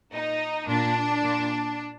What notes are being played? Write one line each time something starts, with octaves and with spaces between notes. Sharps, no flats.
A#2 D#4
A#2 D4
A#2